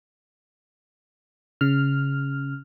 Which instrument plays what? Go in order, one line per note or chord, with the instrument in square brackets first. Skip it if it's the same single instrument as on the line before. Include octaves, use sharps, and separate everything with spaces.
[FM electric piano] C#3 F6